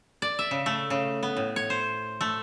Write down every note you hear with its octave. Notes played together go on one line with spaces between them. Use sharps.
D5
E5
C#3
A3
C#3
B3
A2
C#5
C5
A3